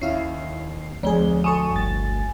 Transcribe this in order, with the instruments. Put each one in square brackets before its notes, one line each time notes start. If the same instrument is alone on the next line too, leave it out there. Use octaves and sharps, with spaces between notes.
[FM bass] D#2 [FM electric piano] C#4 E4 F5 [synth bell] C7
[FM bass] D2 [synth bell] F3 G7 [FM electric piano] C4 G#4
[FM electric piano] A4 C#6 D#6 [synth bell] G#5
[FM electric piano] G1 A6